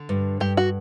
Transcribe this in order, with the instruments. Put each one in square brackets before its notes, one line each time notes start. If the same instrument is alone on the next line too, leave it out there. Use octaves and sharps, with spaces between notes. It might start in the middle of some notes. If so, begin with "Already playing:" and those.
Already playing: [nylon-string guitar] D3
G2
[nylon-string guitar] G2 [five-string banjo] G4
[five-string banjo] F#4